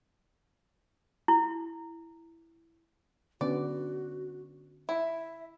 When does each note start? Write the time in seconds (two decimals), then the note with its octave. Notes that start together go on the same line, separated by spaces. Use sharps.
1.28 E4
3.41 D3 B3 C#4 F#4 D5
4.89 E4 E5